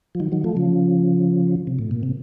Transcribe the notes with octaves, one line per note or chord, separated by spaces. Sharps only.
F3
D#3 F#3
D#3 F#3
F3 A3
C#3 F3
C3
A2
A#2
C3